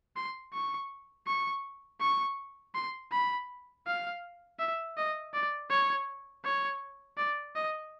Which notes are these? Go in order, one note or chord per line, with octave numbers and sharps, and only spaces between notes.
C6
C#6
C#6
C#6
C6
B5
F5
E5
D#5
D5
C#5
C#5
D5
D#5